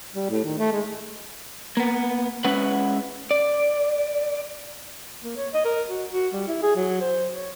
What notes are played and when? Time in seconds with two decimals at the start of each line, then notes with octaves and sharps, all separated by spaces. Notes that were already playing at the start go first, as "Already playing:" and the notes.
0.14 G3
0.29 A2
0.44 D#3
0.58 A3
0.72 G#3
1.77 A#3 B3
2.44 G#3 C#4 E4 B4 F#5
3.31 D5
5.23 A#3
5.37 C#5
5.53 D#5
5.65 A#4
5.89 F#4
6.11 F#4
6.33 G3
6.48 E4
6.63 G#4
6.76 F#3
7.01 C5
7.34 C#5